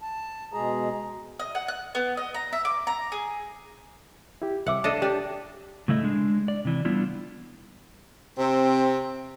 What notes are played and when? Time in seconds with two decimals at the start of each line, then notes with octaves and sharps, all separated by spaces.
0.01 A5
0.53 B2 G#3 G#4 A#5
1.39 D#5
1.55 F#5
1.68 F#6
1.95 B3
2.17 D#5
2.34 A#5
2.53 E5
2.65 D6
2.87 A#5
3.12 G#4
4.42 E4 G4
4.66 C2 E5 F#5 D6
4.84 D4 A4 D#5
5.02 D4 G4
5.88 A2 C#3 A3 E4 D#5
6.03 G#3 D4
6.48 D5
6.65 C3 E3
6.85 G3 B3 D4 E4 F4
8.38 C3 C4